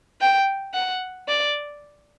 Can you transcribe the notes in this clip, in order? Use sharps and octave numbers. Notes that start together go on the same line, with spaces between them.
G5
F#5
D5